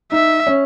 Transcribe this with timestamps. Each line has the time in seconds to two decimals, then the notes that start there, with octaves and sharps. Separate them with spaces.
0.12 D#4 E5
0.47 C#4